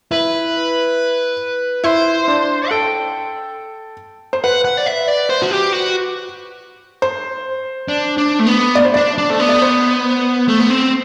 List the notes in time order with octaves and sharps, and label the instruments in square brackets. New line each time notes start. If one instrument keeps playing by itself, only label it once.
[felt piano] E4 [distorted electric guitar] B4
[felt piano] E4 [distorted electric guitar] C5
[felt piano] D4
[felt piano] A4 [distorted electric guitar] G5
[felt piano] C5
[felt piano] B4 [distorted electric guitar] F#5
[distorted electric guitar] F#5
D5
E5
D5
C5
F#4
G4
F#4
[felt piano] C5
[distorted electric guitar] D4
D4
A3
B3
[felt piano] D5
C5
[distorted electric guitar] D4 [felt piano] D5
[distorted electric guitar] D4
A3
B3
[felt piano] D5
C5
[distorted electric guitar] A3
B3
C4